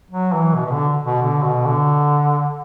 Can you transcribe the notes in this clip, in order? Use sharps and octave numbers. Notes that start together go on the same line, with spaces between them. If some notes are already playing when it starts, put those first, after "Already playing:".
F#3
E3
B2
B2
D3
B2
D3
B2
D3